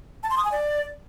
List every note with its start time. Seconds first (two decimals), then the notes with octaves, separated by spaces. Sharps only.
0.23 A5
0.30 C6
0.37 D#6
0.44 G#5
0.52 D5